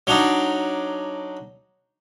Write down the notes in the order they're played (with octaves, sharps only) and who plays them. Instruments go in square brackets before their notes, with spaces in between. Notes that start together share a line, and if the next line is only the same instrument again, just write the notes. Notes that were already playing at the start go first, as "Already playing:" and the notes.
[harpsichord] F#3 D4 D#4